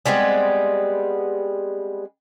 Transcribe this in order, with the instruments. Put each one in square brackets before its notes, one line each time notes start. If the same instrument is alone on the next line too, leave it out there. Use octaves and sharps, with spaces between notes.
[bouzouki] G3 G#3 B3 C4